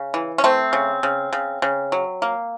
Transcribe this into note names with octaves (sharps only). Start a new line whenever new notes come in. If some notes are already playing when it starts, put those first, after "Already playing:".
Already playing: C#3
E3
C#4
A3 C4
C#3
C#3
C#3
C#3
F#3
A#3